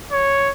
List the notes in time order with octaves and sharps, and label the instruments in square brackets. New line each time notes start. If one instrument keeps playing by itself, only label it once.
[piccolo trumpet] C#5